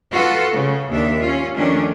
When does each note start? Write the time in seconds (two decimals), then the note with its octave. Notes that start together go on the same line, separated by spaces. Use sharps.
0.12 F4 F#4 A4 B4
0.54 C#3
0.91 D#2 D4 E5
1.21 C#4 F4
1.55 D#3 F3 A3 C#4 D4